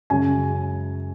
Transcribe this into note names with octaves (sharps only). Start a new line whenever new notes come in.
F#2 C#3 G#3 G#5